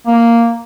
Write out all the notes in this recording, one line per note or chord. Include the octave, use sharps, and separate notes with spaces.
A#3